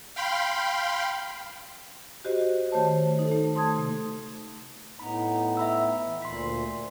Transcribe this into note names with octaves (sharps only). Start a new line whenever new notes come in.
F5 G5 B5 C6
F#4 G4 C5 D#5
D#3 A3 C5 C#5 A5
D#4 A4
A3
A5 C6 D#6 G#6
C3 A3
A2 B3 D#4 B5
E5 B5 E6
E3
D2 A#2 C6 B6